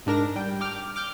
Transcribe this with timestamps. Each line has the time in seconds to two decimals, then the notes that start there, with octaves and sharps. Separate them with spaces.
0.06 G#2 D4 A#4 A#6
0.36 G3 G5
0.60 G5 D6 F6
0.96 D6 F6 G6